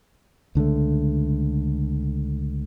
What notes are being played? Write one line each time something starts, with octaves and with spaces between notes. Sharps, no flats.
C#2 D3 D#3 A3